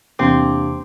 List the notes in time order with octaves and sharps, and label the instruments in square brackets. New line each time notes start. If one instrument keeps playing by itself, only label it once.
[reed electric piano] E2 C3 D6 [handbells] A#3 D4 G4 [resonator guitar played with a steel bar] C4